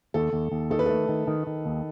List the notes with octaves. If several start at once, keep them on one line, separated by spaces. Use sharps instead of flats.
D#2 A4
D#2
D#2
D#3 A4
B4
A3 A4
D#3
D#3
D#3
D#2